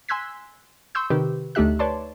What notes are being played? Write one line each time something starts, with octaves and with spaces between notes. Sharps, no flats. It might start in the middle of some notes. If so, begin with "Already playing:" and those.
G#5 C6 E6 F#6 G#6 B6
C6 C#6 E6 G6
C3 D#3 G4 B4
D2 A3 D#4 G4 E5 F#6
B4 C#5 D5 A5 C6